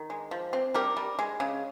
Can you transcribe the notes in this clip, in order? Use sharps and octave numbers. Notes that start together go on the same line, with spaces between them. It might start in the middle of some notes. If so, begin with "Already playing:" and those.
Already playing: D#3
G#3
F3
C4
G3 G4 A#4
G3
G#3
C#3